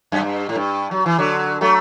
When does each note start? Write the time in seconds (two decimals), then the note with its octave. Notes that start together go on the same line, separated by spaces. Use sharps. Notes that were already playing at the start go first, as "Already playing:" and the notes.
0.12 F#2
0.21 G2
0.49 A2
0.56 G2
0.91 F#3
1.06 E3
1.18 D3 F#3
1.61 F#3 A3